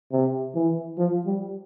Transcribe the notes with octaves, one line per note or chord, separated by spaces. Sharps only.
C3
E3
F3
G3